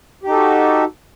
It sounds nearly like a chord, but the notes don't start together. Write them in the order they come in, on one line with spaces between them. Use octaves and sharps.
G4 D#4 A4 F#4